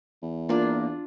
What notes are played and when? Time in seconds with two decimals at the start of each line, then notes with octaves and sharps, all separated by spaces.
0.22 E2
0.49 A#3 D4 F4